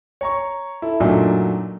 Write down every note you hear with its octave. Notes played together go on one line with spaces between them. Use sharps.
C#5 A#5 C#6
E4 A4
F#2 A#2 F#3 A3 D4 D#4